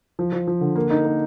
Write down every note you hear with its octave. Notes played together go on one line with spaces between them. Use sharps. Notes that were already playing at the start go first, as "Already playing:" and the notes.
F3
F3
F3
D3
A#3
D#4
A#3